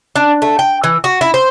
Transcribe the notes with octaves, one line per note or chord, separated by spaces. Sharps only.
D4
A3
G5
E3
F#4
E4
C5